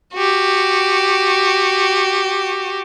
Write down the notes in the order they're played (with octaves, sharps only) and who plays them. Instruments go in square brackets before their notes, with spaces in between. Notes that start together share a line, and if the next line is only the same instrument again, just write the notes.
[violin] F#4 G4